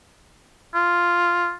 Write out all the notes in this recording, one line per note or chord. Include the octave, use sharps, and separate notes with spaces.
F4